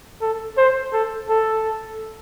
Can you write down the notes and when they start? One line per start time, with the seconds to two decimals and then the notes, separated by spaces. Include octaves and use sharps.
0.21 A4
0.57 C5
0.93 A4
1.29 A4